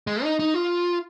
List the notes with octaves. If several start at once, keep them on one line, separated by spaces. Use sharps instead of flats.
G#3
D#4
D#4
F4